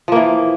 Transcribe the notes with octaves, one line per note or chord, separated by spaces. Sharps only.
E3 F3 A#3